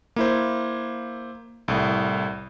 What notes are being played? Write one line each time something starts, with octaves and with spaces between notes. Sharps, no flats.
A#3 E4 C5
C2 A2